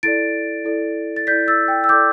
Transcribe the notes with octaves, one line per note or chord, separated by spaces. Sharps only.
E4 A4 D5 A6 D7
E4 A4 D5
A6
E4 A4 D5 G6 B6
E6 A6
G5
E6
E4 A4 D5 D6 G6